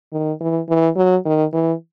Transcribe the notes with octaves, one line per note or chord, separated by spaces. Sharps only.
D#3
E3
E3
F#3
D#3
E3